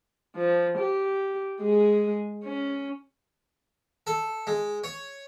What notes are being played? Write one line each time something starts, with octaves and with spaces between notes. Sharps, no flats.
F3
G4
G#3 G#4
C#4
A4
G#3
C#5